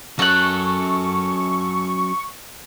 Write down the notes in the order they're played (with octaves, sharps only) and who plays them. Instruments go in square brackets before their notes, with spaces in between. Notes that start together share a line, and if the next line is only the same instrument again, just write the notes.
[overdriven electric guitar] F#3 C#4 [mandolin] A4 F#6 [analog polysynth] C#6